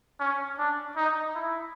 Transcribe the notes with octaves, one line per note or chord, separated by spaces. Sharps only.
C#4
D4
D#4
E4